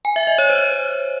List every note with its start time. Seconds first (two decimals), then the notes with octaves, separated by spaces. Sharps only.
0.05 G#5
0.16 E5
0.27 D#5
0.38 C#5
0.50 C5